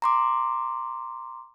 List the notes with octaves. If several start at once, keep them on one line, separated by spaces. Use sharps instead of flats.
A#5 C6 D6